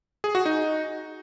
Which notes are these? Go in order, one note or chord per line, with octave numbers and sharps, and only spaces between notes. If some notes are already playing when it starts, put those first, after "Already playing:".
G#4
F#4
D#4